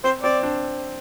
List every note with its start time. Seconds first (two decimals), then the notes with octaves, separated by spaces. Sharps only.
0.04 C4 C5
0.23 C4 D5
0.43 D4